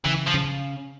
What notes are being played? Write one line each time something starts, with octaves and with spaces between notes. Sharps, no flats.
C#3 E3
F3
C#3